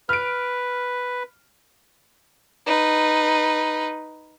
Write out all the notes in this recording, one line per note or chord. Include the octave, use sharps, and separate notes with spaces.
B4 F6 D7
D#4 B4